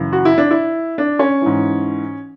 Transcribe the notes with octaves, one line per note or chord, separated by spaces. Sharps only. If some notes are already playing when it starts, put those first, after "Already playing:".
Already playing: F#2 C#3 E3
F#4
E4
D4
E4
D4
C#4
G#2 E3